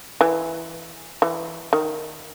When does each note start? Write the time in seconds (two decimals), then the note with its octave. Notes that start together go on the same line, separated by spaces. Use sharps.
0.21 E3
1.22 E3
1.73 D#3